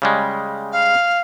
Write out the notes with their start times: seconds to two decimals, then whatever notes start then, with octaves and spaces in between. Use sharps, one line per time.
0.02 C#3 G3 G#3
0.72 F5